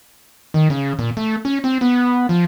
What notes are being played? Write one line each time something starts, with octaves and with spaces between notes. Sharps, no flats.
D#3
C#3
A#2
A3
C#4
C4
B3
F3